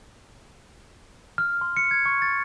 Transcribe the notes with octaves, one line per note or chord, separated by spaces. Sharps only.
F6
C6
C#7
G#6
C#6
A6